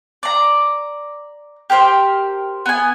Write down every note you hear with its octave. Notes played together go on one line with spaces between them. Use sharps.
D5 A#5
G4 A#4 C5 G5
B3 G#5